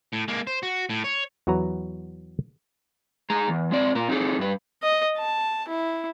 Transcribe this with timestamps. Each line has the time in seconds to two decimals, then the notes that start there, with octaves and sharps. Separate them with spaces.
0.13 A2
0.28 G#3 A#3
0.47 C5
0.63 F#4
0.90 A2
1.04 C#5
1.47 E2 F#3 F#4 B4 A#5
3.30 G#3 G#4 A#5
3.49 E2
3.71 G#3 C4 D5
3.95 A#2 A#4
4.08 C4 D#4 F#4 G#4 A4
4.39 G2 B4
4.83 D#5
5.17 A5
5.68 E4